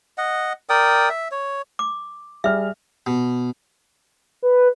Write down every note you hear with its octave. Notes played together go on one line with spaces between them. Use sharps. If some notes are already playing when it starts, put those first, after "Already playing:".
D#5 F#5
A#4 D5 G5 D#6
E5
C#5
D6
G3 G#4 E5 F6
B2
B4